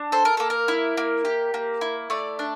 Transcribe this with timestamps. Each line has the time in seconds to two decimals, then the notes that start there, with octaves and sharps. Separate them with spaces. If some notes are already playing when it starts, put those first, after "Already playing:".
Already playing: D4
0.12 A4 C5
0.25 A#4
0.37 A#3 A4
0.50 A#4
0.68 E4
0.98 A#3
1.25 G4
1.54 A#3
1.81 E4
2.10 A3 D5
2.39 D4